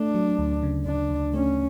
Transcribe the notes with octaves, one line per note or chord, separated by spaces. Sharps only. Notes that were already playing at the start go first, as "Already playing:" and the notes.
Already playing: A3 D4
F#3
D2
C#3
D2 D4
D2
A3 C#4